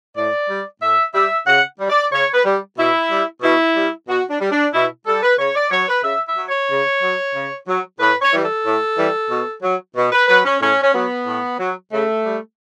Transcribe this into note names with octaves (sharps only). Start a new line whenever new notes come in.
A2 D5
G3
A2 E5
G3 E5
C#3 F#5
G3
D5
C#3 C#5
B4
G3
B2 E4
G3
B2 E4
G3
B2 F#4
D4
G3
D4
B2 E4
G3 A4
B4
C#3 C#5
D5
F#3 C#5
B4
C#3 E5
E5
F#3
C#5
C#3
F#3
C#3
F#3
A2 B4
C#5
E3 G3
A4
A2
E3 G3
B2
F#3
B2
B4
F#3 B4
C#4
A2 C#4
C#4
F#3 B3
A2
F#3
C#3 A3
G3